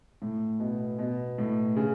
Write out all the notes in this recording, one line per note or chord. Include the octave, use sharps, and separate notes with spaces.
A2
B2
B2
A2
C#3